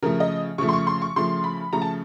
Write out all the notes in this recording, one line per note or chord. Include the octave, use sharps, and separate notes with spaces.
C#3 F3 A3 A#4
D#5
C#3 F3 A3 C#6
C6
C#6
C6
C#6
C#3 F3 A3 C6
B5
C#3 F3 A3 A#5
A5